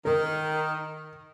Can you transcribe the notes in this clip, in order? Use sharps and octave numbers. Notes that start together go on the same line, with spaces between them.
D#3 A#4